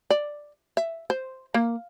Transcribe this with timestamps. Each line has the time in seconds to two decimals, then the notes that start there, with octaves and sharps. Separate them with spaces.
0.10 D5
0.77 E5
1.10 C5
1.54 A#3